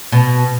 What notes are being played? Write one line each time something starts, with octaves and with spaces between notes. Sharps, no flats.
B2